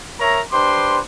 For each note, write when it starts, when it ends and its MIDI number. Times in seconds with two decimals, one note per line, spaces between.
0.20 0.40 70
0.20 0.40 73
0.20 0.40 76
0.20 0.40 82
0.52 0.99 62
0.52 0.99 67
0.52 0.99 71
0.52 0.99 72
0.52 0.99 84
0.52 0.99 86